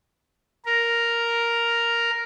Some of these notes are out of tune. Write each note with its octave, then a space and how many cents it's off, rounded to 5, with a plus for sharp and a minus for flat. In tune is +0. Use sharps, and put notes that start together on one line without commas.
A#4 +0